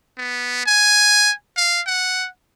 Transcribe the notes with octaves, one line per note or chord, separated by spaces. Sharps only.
B3
G#5
F5
F#5